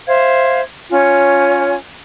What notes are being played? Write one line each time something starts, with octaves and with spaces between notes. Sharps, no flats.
C5 E5 F5 G#6
C#4 F4 C#5 G#5